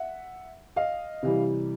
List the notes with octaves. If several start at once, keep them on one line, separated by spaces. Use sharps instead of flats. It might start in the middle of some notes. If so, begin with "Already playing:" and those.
Already playing: E5 F#5
D#5 F5
C3 E3 G3